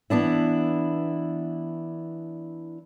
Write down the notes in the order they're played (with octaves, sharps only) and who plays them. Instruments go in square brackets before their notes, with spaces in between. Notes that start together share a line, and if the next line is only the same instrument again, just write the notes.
[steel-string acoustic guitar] E3 B3 D4 E4